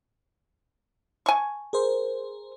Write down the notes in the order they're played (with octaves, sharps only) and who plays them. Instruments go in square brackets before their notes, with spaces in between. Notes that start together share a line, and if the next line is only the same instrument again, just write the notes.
[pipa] G#5 C#6
[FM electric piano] G#4 A#4 C5